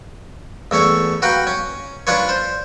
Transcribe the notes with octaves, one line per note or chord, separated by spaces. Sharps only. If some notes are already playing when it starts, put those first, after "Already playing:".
E2 A3 C#4 C#5
F#4 B4 F5 G5 A#5
C#4
C#4 D4 F4 B4 C#5
C5